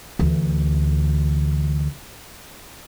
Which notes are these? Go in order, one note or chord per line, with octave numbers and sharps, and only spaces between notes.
D2 E3